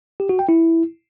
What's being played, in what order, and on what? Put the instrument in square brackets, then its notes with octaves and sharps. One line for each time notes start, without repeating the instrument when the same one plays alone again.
[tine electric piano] G4
F#4
G5
E4